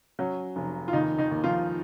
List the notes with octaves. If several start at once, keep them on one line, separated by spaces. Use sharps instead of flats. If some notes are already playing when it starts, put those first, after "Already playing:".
F#3 C#4
F1
F4
D#2 D#3 D#4
D#3 D#4
D#2
F3 F4